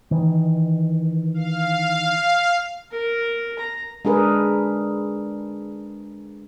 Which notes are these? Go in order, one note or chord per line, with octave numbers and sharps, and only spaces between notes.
D#3 E3
F5
A#4
A#5
G#3 D4 G#4 A#4 B4